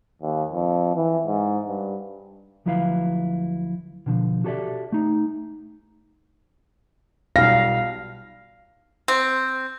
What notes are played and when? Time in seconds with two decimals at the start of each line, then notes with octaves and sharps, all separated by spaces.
0.22 D#2
0.52 F2
0.96 E3
1.26 G#2
1.68 G2
2.66 D2 F3 F#3 E4 B4 F5
4.06 B2 D3 F3
4.44 F#4 G4 A4 C#5 D5 E5
4.92 A3 D#4
7.36 B1 G3 F5 A#6
9.08 C4